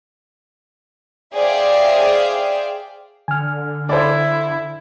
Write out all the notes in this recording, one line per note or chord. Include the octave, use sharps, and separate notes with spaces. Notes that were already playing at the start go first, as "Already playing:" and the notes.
G#4 C5 D5 E5 F5 G5
D3 G#5 F6
E4 C5 D5